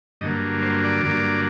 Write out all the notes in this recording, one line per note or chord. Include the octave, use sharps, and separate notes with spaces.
G2 D3 F#3 A#3 D#5
C5
D5
G2 D3 F#3 A#3